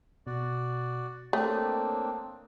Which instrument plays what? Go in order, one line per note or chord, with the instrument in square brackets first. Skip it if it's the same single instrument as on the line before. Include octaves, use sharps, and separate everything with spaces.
[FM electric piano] B2 [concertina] F#4 D5
[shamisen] A3 [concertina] A#3 C4 D4 [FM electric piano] C#5 G5 D#6